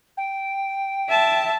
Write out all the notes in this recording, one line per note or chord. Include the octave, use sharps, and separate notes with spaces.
G5
E5 A5